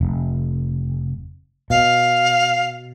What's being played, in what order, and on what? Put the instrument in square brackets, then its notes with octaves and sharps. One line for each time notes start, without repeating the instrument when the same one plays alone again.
[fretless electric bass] F1
[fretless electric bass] B2 [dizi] F5